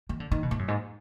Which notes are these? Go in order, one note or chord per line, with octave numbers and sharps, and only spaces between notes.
D#3
D3
D#3
B2
G#2
F#2
G#2